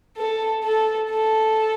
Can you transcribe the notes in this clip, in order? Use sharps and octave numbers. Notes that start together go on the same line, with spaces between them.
A4
A4
A4